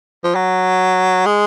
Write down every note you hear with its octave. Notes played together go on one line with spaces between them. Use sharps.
F3
F#3
G#3